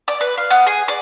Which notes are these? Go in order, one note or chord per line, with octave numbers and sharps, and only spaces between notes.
D5
B4
F5
B3
G#4
D5